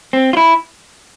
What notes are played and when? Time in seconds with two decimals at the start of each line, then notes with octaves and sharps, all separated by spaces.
0.13 C4
0.33 F4
0.37 E4